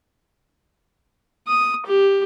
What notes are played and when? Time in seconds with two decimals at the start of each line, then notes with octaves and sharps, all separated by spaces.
1.48 D#6
1.87 G4